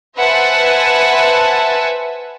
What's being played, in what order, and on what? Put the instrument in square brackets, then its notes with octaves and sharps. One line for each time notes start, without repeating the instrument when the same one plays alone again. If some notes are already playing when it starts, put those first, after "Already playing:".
[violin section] B4 C5 E5 F#5 G#5 A5